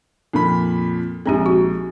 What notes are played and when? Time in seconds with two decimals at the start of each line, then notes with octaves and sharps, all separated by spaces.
0.33 F2 A#2 B5
1.26 A#1 G#3 C4 D#4 G4
1.46 F#4